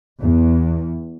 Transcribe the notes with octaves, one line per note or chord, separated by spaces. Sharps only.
E2